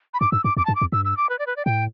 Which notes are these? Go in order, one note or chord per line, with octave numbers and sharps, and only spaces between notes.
B5
G2 D6
G2 E6
G2 D6
E2 D6
G2 A5
D6
E2
G2 E6
E6
D6
B4
D5
B4
D5
A2 G5